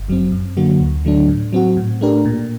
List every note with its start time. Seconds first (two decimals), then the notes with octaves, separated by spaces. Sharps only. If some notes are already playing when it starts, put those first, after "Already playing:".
Already playing: G1
0.08 F#2 F#3 C4
0.32 F#2
0.57 D3 F#3 A#3 F#4
0.80 D2
1.05 D3 F#3 A3 D4
1.28 A2
1.53 F#3 C4 F#4
1.77 A2
2.01 A3 D4 G4 A#4
2.25 A#2